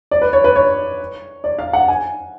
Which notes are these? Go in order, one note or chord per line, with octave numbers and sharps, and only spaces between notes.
D5
B4
C#5
B4
C#5
D5
F5
F#5
G#5